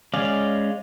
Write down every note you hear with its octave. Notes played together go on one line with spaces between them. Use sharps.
G#3 C#4 D5 F5